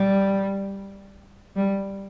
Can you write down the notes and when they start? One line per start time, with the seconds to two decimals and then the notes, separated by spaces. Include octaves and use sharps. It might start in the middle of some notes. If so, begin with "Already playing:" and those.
Already playing: G3
1.56 G3